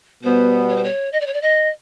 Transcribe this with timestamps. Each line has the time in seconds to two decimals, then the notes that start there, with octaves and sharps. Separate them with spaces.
0.23 B2 G3 B3 C5
0.68 C#5
0.76 C5
0.83 C#5
1.12 D#5
1.20 D5
1.26 C#5
1.33 D5
1.42 D#5